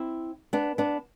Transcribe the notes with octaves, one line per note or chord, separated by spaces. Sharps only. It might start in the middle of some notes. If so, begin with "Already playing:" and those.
Already playing: C4 E4
B3 D4
B3 D4